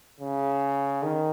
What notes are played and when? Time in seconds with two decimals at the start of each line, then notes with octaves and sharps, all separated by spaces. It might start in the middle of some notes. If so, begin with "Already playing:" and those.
0.21 C#3
1.03 D#3